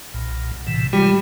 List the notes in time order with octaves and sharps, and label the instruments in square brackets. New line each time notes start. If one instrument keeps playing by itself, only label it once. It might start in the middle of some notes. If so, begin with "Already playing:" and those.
[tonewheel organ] B1 A#2
A2 C3 E3
[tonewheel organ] E3 G#3 F4 [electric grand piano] G3